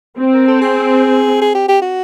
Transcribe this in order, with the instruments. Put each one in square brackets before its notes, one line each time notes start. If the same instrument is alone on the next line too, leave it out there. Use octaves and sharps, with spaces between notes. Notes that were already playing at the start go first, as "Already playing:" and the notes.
[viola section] C4
[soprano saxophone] A#4
A4
G#4
G#4
G4
G4
F#4